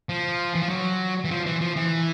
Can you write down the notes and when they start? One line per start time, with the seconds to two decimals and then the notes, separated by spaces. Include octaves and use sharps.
0.09 F3
0.54 E3
0.63 F3
0.69 F#3
1.25 E3
1.31 F3
1.46 E3
1.61 F3
1.76 E3